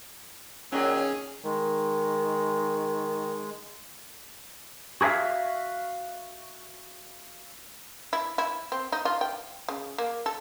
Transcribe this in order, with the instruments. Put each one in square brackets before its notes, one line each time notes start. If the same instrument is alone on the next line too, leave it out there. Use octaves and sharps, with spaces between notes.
[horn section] A#2 D#3 F#3 [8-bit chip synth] C#4 G#4
[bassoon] D#3 [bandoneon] G#3
[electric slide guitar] F#4 G#4 A#4 E5 F5
[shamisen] E4
E4
C4
D#4
F4
G5
C#3
A#3
A4